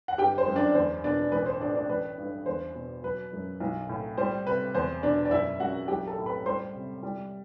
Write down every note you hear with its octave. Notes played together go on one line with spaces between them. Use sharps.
F#5
G1 G4 G5
C5
F#2
D4 D5
E2 C5
B2 D4 D5
A1 B4
C5
A2 D4 D5
D4 D5
A1 B4
G2
E2 C5
B2
F#3 B4
F#2
B1
A2
G3 C5
C3 B4
E2 C5
B2 D4 D5
D5
F#1 E4 E5
F#2 F#4 F#5
B1 G4 G5
A4 A5
A2
B4 B5
G3 C5 C6
C3
G3